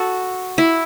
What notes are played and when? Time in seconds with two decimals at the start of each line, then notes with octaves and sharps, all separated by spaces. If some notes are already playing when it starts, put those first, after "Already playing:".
Already playing: F#4 A4
0.58 E4